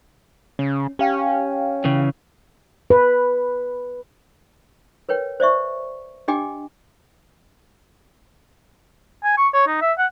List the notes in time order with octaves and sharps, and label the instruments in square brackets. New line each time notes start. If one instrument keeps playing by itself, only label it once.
[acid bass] C#3 [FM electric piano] C#4
[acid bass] C#4 [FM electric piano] G4 F5 G5
[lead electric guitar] C#3 E3
[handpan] B4
[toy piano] A#4 B4 C#5 G5
C5 D5 E5 C#6
D4 G4 D#5 G5 G#5 D6
[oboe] G#5
C#6
C#5
D#4
E5
F#5